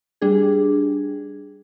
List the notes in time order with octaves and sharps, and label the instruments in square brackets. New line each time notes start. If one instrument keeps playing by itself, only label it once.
[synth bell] G3 D4 G#4